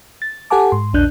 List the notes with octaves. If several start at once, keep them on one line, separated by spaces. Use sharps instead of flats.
A6
G4 A4 F#5 G#5 A5 D6
G#2 C6
A#1 E2 D4 F#6 G6